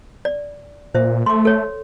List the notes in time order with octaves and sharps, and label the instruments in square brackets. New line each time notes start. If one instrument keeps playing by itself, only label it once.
[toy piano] D5
[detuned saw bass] A#2 [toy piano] C5 E5
[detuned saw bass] A3 [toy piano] C6 D6
[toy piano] A4 C#5